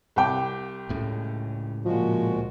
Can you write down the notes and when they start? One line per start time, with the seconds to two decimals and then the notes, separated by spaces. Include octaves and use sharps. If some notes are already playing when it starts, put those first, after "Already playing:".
0.16 C2 G5 D6
0.89 C#2 A2 C#3
1.85 A#2 F3 G#3 F#4